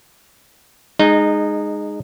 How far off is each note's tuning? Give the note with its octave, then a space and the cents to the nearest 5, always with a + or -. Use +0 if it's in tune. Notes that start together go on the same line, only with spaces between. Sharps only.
G#3 +0 D#4 -20